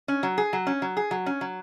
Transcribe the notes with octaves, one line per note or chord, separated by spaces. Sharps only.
C#4
F#3
G#4
F#3
C#4
F#3
G#4
F#3
C#4
F#3